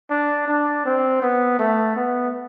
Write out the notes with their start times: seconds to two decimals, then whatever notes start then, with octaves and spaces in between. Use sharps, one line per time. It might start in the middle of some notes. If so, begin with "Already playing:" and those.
0.10 D4
0.48 D4
0.85 C4
1.22 B3
1.59 A3
1.96 B3